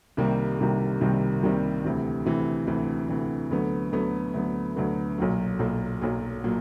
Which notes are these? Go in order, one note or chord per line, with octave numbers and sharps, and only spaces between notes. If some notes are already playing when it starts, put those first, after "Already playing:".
C2 C3 D#3 G3 A#3
C2 C3 D#3 G3 A#3
C2 C3 D#3 G3 A#3
C2 C3 D#3 G3 A#3
D2 C3 E3
D2 C3 E3
D2 C3 E3
D2 C3 E3
D2 D3 F#3 B3
D2 D3 F#3 B3
D2 D3 F#3 B3
D2 D3 F#3 B3
B1 A#2 F#3
B1 A#2 F#3
B1 A#2 F#3
A#2 F#3